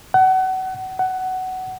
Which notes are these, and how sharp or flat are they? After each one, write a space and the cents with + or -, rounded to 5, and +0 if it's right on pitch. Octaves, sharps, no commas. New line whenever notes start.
F#5 +30
F#5 +15